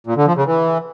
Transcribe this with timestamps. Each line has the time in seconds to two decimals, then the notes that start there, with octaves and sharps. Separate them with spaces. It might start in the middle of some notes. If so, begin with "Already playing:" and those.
0.07 A#2
0.17 D3
0.27 F3
0.36 C#3
0.46 E3